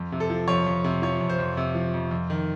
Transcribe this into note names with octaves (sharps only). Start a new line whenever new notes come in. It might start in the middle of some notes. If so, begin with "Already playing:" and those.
Already playing: F2
C3
A4
F3
F2 C#5
F2
C3
F3 C#5
F2
C5
F2
C3
F3
F2
F2
D#3